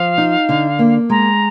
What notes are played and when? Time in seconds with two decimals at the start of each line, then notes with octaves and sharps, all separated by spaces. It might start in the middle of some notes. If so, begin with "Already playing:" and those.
Already playing: F3 F5
0.18 D#4
0.49 D3
0.79 A#3
1.10 G#3 A#5